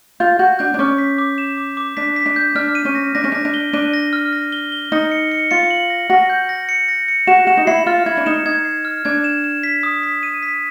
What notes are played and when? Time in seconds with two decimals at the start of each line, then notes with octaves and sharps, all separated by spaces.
0.20 F4 G6
0.39 F#4 G6
0.59 D4 G6
0.74 D4
0.79 C#4 D6
0.98 B6
1.18 D6
1.38 E7
1.57 D6
1.77 D6
1.97 D4 B6
2.16 B6
2.26 D4
2.36 G6
2.55 D4 F6
2.75 D#7
2.85 C#4
2.95 A#6
3.15 D4 A#6
3.24 C#4
3.32 D4 A#6
3.45 D4
3.54 G7
3.73 D4 D#7
3.93 A#6
4.13 F6
4.33 A#6
4.52 G7
4.72 G7
4.92 D#4 A#6
5.11 C#7
5.31 C#7
5.51 F4 C#7
5.71 F#7
5.90 A#6
6.10 F#4 A#6
6.30 G6
6.49 A#6
6.69 C#7
6.89 A#6
7.08 C#7
7.27 F#4 E7
7.47 F#4 E7
7.57 D#4
7.67 E4 C7
7.86 F4 F6
8.06 E4 G#6
8.17 D4
8.26 D#4 E7
8.45 D#4 G#6
8.65 C7
8.85 F6
9.05 D4 G#6
9.24 E7
9.44 E7
9.63 B6
9.83 D#6
10.03 B6
10.23 D#7
10.43 B6